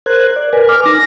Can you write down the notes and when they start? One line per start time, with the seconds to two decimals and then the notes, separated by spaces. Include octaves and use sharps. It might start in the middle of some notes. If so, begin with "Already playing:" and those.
0.06 A#4 C5 F#6 G#6
0.36 D5
0.53 A#4 B4 G#5
0.69 D6 F6
0.86 D#4 A#6